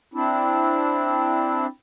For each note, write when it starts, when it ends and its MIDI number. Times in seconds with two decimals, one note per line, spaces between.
0.14 1.66 60
0.14 1.66 62
0.14 1.66 64